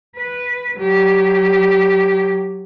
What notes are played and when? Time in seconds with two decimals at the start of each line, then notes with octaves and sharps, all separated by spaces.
0.16 B4
0.77 F#3 G4